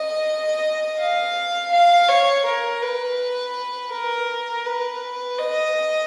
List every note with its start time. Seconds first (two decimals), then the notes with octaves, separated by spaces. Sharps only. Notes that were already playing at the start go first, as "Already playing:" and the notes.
Already playing: D#5
0.99 F5
1.72 F5
2.09 C#5
2.45 A#4
2.82 B4
3.92 A#4
4.66 B4
5.39 D#5